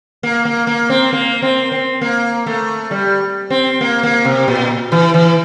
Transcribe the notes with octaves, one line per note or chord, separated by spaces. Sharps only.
A#3
A#3
A#3
C4
A#3
C4
C4
A#3
A3
G3
C4
A#3
A#3
C3
A#2
E3
E3